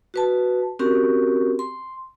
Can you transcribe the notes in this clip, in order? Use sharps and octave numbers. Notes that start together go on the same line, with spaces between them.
F#4 B4 A5
C4 C#4 F#4 G4 A#4
C6